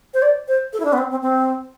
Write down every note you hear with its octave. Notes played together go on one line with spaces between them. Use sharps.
C5
D5
C5
A4
E4
D4
B3
C4
C4
C4